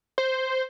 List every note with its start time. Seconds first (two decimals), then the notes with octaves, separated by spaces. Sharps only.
0.18 C5